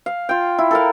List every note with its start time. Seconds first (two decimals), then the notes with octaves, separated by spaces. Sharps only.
0.06 F5
0.29 F4 G5
0.59 E4
0.71 A4 A#4 F5